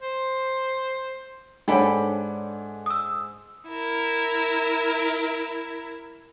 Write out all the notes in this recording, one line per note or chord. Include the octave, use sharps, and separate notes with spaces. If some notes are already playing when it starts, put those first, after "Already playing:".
C5
G#2 D4 A4 C#5 D5 F#5 G#5 B5
D#6 E6
E4 A#4